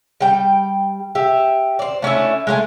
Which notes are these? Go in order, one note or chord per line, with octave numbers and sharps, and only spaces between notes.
G3 G5
G4 E5
C5 D5
A3 C#4 D4 E4
G#3 A3 G#5